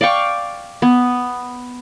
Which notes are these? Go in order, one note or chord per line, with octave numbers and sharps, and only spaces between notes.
D5 F5 G5 C#6
B3